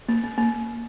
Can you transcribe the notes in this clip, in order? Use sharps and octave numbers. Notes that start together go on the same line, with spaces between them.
A#3
A#3
A#3